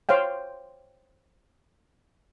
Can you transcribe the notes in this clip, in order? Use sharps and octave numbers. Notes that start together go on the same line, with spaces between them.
C5 C#5 F5 G5